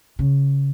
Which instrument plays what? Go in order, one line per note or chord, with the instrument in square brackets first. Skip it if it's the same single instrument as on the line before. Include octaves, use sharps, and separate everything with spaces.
[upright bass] C#3